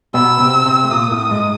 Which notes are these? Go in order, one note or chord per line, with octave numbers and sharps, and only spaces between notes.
B2 B3 E6
C3 C4
C3 C4
A3
A#2 A#3 D#6
A2 A3
G#2 G#3